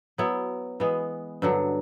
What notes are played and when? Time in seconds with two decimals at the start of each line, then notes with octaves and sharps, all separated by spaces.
0.18 F#3 B3 E4
0.80 E3 G#3 B3
1.42 G2 D3 F#3